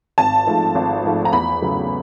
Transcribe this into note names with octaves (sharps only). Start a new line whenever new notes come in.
G#1 A5
G#2 F3 A3
G#1
G#2 F3 A3
A#5
E2 B5
C#3 F#3 A3